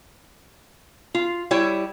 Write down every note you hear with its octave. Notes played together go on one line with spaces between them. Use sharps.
F4
G3 E4 C#5 G5